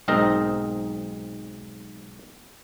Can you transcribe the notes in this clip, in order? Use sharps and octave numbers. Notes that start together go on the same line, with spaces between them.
B1 G#2 C4 D#4 A#4 A#5